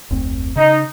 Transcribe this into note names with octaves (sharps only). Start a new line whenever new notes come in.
F1 D2 C4
C#3 D#4